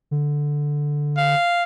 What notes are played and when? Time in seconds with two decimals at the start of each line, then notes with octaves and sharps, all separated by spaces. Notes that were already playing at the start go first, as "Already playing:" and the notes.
0.11 D3
1.18 F5